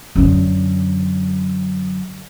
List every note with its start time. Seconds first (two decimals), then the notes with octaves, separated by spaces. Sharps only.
0.16 F#2 D3